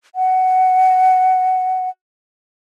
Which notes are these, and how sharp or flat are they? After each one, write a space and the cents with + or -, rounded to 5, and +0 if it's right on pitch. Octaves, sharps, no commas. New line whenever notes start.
F#5 +10